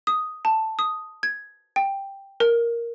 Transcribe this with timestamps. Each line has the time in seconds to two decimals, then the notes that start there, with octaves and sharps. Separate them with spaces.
0.07 D#6
0.45 A5
0.79 D#6
1.23 G#6
1.76 G5
2.40 A#4